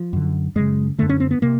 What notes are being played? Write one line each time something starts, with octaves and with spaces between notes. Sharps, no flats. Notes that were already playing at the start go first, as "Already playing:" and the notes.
Already playing: F3
F#2 D3
F#2 C#3 G#3
F#2 D3 A3
C#4
C4
B3
C3 A#3